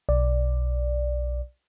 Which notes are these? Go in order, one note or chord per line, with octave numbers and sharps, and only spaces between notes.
B1 D5